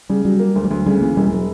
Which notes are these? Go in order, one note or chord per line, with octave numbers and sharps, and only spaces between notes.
C#3 G3
F#3 G3
A#3
D2
G3
D2 F#3
C#3 G3
E3 A#3
E1 G3
F#3